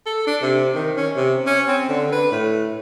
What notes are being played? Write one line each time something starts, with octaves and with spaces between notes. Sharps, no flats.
A4
D4
C3
D#3
C#4
C3
C#4
C4
D3
B4
A2